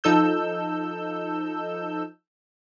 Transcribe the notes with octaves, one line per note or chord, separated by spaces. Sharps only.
F3 D#4 A4 E6 G6